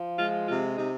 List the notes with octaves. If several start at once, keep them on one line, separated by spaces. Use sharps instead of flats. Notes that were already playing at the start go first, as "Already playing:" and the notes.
Already playing: F3
G#3 F4
C3 F4
C3 D#4